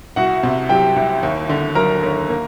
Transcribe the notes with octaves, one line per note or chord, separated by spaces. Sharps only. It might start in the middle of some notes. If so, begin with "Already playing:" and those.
C2 F#4 F#5
C3
F#3 G4 G5
C2
D#2
D3
F#3 A#4 A#5
D#2
A#3